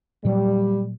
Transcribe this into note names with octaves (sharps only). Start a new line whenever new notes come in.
A#2 F#3 G3